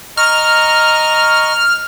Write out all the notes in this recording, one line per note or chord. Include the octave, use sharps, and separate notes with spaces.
D#5 A#5 C#6 F6